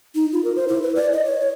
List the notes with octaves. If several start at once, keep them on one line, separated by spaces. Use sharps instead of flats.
D#4
F4
A#4
C5
E4
B4
D5
D#5
C#5
C#5